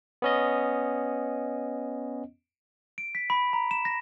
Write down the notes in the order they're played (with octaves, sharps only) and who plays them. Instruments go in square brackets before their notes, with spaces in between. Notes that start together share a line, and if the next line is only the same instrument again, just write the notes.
[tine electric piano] B3 C#4 D#5
[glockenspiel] D7
B6
B5
A#5
E7
A#6